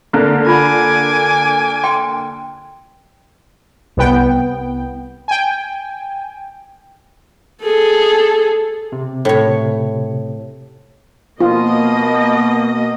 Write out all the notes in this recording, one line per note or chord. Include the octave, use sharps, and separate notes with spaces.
D3 A#3
F4 G#5 B5 D6
G5 C6
C2 B3 G5
G5 G#5
G#4 A4
C3
A2 C#5
B2 A#3 F4 D#5